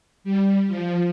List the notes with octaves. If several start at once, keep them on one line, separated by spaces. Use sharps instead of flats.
G3
F3